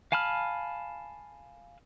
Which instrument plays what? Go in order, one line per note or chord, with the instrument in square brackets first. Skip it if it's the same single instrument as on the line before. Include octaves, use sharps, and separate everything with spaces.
[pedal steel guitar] F5 G#5 A5 B5 F6